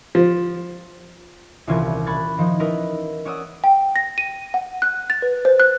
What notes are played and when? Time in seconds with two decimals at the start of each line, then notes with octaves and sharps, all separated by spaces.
0.15 F3
1.67 D#1 C2 E3 C#4 F4 G#6
2.06 B5 C#6 F#6 G#6 A6
2.38 D#3 F3 D#4
2.60 C#4 D#4 E4 A#4 B4 D#5
3.25 C#4 C#5 D5 F#5 D#6 E6
3.64 G5
3.96 A#6
4.18 D#7
4.54 F#5
4.82 F#6
5.10 A6
5.22 B4
5.45 C5
5.60 F#6